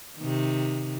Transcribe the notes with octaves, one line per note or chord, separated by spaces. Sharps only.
C3 D#3